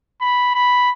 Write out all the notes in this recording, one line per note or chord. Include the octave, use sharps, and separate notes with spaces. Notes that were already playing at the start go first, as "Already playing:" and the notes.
B5
B5